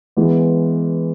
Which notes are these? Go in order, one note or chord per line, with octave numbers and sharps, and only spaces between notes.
E3 G#3 B3